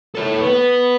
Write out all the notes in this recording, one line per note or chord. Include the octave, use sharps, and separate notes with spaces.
A4 C#5
B3